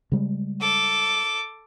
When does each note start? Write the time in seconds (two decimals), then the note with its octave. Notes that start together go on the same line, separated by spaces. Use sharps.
0.12 C#3 G3 G#3
0.61 A4 D6